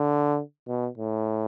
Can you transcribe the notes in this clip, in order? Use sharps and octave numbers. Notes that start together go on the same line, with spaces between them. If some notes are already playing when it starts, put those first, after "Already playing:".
Already playing: D3
B2
A2